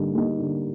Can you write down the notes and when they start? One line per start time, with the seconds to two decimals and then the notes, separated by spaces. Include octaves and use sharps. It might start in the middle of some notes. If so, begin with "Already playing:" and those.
Already playing: D3 G3 A#3 D#4
0.15 G3 A#3 D#4
0.39 D3